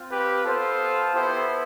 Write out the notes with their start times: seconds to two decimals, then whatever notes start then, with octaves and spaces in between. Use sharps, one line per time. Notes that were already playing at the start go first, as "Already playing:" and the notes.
Already playing: C4 F4
0.11 G4 B4
0.46 B3 F4 A4 C5
1.14 B3 E4 G4 A4 C5